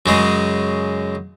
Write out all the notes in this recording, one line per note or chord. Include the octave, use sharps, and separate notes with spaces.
F#2 C#3 G#3